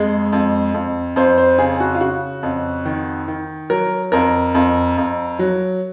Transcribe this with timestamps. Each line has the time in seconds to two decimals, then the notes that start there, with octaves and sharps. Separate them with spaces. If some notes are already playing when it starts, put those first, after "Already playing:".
Already playing: F2 G#3
0.32 F2
0.74 F2
1.16 F2 C5
1.38 C5
1.58 C#3 G#4
1.80 F#4
1.95 F4
2.01 C#3 F#4
2.43 F2
2.85 D#3
3.28 D#3
3.70 F#3 A#4
4.12 F2 A#4
4.55 F2
4.98 F2
5.39 F#3